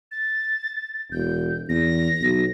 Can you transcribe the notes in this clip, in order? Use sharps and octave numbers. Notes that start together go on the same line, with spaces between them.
A6
E1 G6
E2 A#6
B1